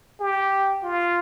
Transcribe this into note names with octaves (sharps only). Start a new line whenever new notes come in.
G4
F4